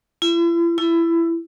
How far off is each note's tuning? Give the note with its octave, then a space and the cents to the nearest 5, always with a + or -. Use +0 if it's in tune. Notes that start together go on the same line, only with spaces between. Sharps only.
E4 +45
E4 +20